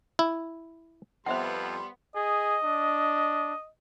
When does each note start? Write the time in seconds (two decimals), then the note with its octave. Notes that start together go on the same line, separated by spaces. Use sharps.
0.19 E4
1.26 F2 G3 B3 C5 E5 F#5 C6
2.15 G#4 D#5
2.64 D4